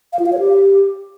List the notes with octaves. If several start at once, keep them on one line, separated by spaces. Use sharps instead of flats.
F5
F4
F5
C#5
G4